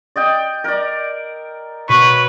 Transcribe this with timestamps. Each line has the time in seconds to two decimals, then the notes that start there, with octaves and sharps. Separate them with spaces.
0.16 D5 D#5 G5
0.64 A#4 D5
1.89 B2 B4 C#5 C#6